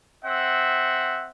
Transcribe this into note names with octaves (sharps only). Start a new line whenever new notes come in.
C4 E5 F#5